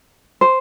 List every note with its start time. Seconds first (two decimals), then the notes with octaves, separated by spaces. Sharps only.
0.41 C5